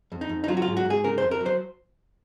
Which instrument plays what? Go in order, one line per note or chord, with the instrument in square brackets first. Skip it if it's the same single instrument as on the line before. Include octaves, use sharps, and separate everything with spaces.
[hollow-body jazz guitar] F2
D#4
F2
D#4
F#3 F4
F#4
F4
G#2
F#4
G#2 G#4
C#3 A#4
F2 C5
A#4
F#3
C5